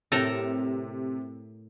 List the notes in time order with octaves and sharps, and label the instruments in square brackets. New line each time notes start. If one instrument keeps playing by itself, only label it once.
[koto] A2 A4 A#4 [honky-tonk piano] C3